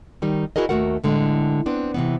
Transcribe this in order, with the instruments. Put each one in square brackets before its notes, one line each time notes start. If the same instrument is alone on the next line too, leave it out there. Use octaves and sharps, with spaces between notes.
[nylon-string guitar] D#3 G3 D#4
E4 F#4 G#4 A#4 D#5
D#2 C#3 A3 F#4 A#4 F#5
A2 D3 G#3
B3 C4 D4
C3 E3 B3